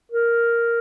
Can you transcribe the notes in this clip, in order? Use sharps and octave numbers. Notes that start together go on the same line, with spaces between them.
A#4